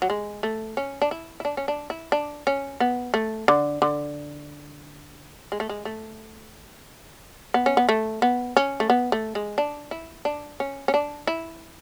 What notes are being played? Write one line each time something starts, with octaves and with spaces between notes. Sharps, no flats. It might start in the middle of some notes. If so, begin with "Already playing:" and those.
F#3
G#3
A3
C#4
D4
E4
E4
D4
C#4
D4
E4
D4
C#4
B3
A3
D3
D3
G#3
A3
G#3
A3
B3
C#4
B3
A3
B3
C#4
A3
B3
A3
G#3
D4
E4
D4
C#4
C#4
D4
E4